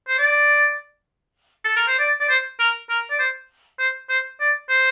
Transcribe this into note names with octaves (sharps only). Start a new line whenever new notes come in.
C5
D5
A4
A#4
C5
D5
D5
C5
A#4
A#4
D5
C5
C5
C5
D5
C5